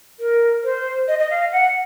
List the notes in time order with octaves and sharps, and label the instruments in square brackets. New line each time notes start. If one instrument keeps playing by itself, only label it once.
[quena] A#4
C5
D#5
D#5
F5
F#5